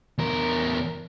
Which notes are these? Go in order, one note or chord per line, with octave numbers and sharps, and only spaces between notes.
E2 A#4